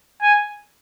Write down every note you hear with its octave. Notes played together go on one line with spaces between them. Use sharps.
G#5